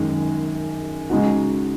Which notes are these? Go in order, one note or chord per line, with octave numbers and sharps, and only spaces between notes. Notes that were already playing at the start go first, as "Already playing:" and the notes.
Already playing: F#2 D#3 G#3
C#3 G#3 D#4 F#4